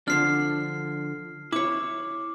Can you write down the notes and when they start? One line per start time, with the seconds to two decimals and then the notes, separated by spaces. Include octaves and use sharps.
0.08 D3 F3 D4 F6 C7
1.52 E4 C#5 D6